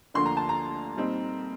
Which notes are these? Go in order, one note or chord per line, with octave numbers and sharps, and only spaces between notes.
D2 D3 F3 A#3 D4 C6
A#5
A5
A#5
A#2 G3 C4 D#4